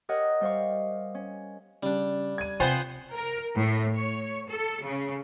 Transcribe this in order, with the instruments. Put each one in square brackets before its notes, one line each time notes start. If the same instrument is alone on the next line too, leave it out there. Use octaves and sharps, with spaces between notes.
[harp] G4 A#4 C#5 D#5 F#5
G3 C5 F5 C#6
C#4
[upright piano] C#3 [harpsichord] G3 D4
[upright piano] G#6 D#7
[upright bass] C3 [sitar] B3 C5 [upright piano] F4 G5 G#5
[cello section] A#4
A2
C#5
A4
C#3